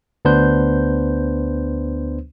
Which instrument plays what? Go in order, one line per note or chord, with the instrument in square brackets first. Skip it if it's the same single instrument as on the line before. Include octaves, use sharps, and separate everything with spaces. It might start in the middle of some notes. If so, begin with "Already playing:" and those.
[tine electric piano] D2 B3 D4 B4 C5 G6